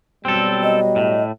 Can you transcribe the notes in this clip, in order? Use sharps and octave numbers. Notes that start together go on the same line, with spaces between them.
B2 F#3 G3 C4 A4
D#5
A2